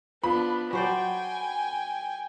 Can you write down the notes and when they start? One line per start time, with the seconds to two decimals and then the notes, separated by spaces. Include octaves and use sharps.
0.24 F3 B3 D4 B5
0.73 F#3 C5 D5 G5 G#5